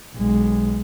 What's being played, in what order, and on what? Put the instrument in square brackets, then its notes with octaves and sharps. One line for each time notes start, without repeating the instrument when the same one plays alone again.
[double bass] B1 G#3